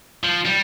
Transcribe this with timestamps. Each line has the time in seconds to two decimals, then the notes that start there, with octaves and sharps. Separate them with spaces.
0.23 F3
0.45 G3